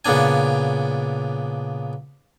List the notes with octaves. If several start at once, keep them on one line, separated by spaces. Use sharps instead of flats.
A#2 C#3 B3 D4 G#5